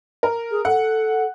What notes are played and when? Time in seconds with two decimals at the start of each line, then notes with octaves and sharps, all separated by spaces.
0.23 A#4
0.51 G#4
0.65 A4 F#5